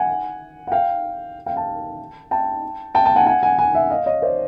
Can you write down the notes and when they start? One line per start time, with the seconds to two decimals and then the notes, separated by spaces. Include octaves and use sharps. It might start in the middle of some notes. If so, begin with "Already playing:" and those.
Already playing: F#5 G#5
0.67 F#5
0.72 F5 G5
1.46 F5 G5
1.57 G5 A5
2.31 G5 A5
2.95 G5 A5
3.06 G5 A5
3.16 F#5 G#5
3.27 F#5 G#5
3.43 F#5 G#5
3.58 F#5 G#5
3.75 E5 F#5
3.90 D#5 F5
4.06 C#5 D#5
4.22 C5 D5